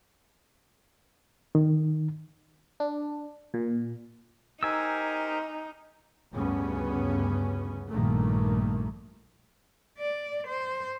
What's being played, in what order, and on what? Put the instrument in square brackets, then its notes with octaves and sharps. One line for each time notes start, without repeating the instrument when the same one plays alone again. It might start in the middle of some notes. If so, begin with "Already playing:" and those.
[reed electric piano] D#3
[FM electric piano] D4
A#2
[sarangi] D#4 [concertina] G4 A#4 C5 [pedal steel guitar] G#5 E6
[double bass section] D2 G2 C#3 B3 C#4
A#1 G2 A#2 D#3 A3 A#3
[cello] D5
C5